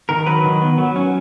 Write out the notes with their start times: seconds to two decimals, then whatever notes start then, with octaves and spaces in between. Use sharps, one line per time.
0.09 D#3 A#4
0.27 F#3 B4
0.44 D#3
0.62 B3
0.78 F#3
0.96 C#4